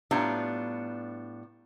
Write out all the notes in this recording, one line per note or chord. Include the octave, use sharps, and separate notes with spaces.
A2 G3 B3 D4 F4 A#5